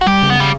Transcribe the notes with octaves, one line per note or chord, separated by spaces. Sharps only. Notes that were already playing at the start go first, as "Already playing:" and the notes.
F#4
G3 G4
C#3
B3
G3